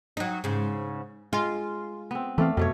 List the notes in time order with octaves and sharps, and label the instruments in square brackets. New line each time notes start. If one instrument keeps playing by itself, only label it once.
[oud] F#3 D#4
G#2 C#3
[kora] G#3 [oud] F4
[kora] B3 C4
[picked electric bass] E3 C4 [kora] A3 D5 F5
[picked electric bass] F2 [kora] B2 A3 C#5